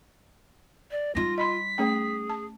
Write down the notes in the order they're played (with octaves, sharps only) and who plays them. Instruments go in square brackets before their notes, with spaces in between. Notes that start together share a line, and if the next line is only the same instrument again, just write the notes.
[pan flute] D5
[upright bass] G3 D#4 [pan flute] F4 [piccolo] A#6
[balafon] D#5 B5 C6 [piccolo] B6
[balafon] A3 C#4 G5 [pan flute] G#4
[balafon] A5